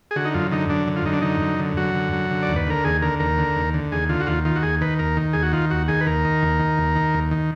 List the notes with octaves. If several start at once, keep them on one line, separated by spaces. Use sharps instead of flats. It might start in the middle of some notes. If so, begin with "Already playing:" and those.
G#4
D3 F#4
D#4
F#2 F4
D3 D#4
F#2 D4
D3
F4
F#2 D#4
D4
D3 D#4
F#2
D3
F#2 F#4
D3
F#2
D3
D5
D#2
B4
D3 A#4
D#2 G#4
D3 A#4
D#2 A#4
D3
D#2
D3
D#2 G#4
D3 F4
F#4
D#2 F4
D#3 F4
F#4
D#2 G#4
D#3 B4
D#2 A#4
D#3
D#2 G#4
F#4
D#3 F4
D#2 F#4
D#3 G#4
B4
D#2 A#4
D#3
D#2
D#3
D#2
D#3
D#2
D#3